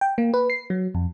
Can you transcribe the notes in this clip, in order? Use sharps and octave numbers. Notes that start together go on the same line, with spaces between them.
G5
A#3
B4
C7
F#3
F2